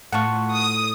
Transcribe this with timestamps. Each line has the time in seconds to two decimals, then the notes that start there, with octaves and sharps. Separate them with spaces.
0.13 A2 F4 F#5 A5 C#6
0.53 D#6